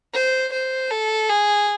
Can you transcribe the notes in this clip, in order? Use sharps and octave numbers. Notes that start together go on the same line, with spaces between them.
C5
C5
A4
G#4